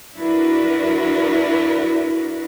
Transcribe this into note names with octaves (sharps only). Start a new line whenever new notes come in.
D4 E4 F#4 A#4 B4